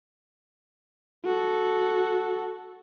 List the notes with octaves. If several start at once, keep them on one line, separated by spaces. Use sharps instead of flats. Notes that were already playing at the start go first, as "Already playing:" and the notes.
F#4 A4